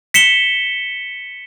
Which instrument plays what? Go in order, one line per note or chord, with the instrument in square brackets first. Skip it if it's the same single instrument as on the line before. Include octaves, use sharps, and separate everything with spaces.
[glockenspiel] B6 C#7 E7 G7